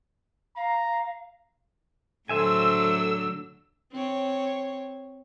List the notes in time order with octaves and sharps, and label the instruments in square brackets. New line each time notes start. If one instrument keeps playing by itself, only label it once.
[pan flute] F5 [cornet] A#5
[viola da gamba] A2 D3 F#3 [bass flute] A4 [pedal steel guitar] C5 E5 G#5 [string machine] E6
[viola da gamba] C4 C#5